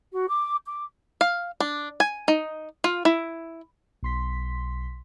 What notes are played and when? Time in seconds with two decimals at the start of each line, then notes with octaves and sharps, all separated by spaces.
0.11 F#4
0.28 D6
0.65 D6
1.21 F5
1.60 D4
2.00 G#5
2.28 D#4
2.84 F4
3.05 E4
4.03 B1 C6 B6